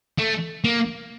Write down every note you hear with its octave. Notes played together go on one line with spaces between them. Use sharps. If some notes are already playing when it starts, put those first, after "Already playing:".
A3
A#3